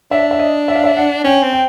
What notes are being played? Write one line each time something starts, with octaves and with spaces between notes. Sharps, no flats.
D4 E5
E5
D#5
E5
F5
E5
F#5
C#4 G5
C4
G5